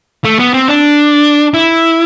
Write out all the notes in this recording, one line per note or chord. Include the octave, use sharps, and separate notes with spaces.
A3
B3
C4
D4
E4